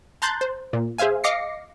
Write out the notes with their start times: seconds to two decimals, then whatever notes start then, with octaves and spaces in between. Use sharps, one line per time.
0.22 A5 A#5 C6 F#6 G6 A6
0.41 C5
0.73 A#2
0.98 G#4 C5 E5 F5 G#5
1.24 D#5 F5 D6 A#6 C7 C#7